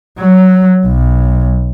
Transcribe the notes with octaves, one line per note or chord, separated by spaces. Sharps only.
F#3
B1